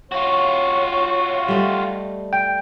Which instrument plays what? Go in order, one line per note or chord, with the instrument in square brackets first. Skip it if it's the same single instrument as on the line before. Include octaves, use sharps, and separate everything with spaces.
[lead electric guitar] F4 F#4 [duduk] C#5
[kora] G3 A3 D#5
[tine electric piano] G5